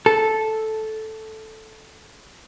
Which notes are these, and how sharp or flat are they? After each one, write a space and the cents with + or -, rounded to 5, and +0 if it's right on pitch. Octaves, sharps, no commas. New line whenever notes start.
A4 -5